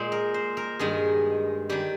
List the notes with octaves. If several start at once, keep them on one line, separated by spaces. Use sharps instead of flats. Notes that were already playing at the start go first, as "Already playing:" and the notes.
Already playing: A#2 G#3 C5
A#4
C5
A#4
G2 D#3 G#3 G#4
D#3 G3 G4